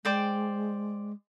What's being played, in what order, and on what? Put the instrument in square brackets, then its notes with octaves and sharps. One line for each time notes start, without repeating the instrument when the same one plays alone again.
[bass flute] G#3 [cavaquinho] C5 D5 G5